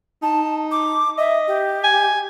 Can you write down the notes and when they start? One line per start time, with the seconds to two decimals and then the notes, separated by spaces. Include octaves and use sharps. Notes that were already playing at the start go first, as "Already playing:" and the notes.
0.22 D#4 A5
0.71 D6
1.18 D#5 E5
1.47 G4
1.84 G#5